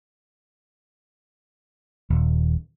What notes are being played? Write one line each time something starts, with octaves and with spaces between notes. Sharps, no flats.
D#1